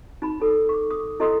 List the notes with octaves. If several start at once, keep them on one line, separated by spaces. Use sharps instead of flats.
D#4 B5
D#4 A4
C#6 D6
D#6
E4 A4 D#5 C6 D#6 E6